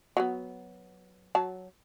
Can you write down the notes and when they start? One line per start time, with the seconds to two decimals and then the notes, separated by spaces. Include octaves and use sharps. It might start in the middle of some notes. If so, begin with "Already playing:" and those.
0.17 F#3 A#3 B3
1.35 F#3 A5